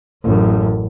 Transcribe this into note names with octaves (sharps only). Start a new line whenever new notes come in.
A1 F#2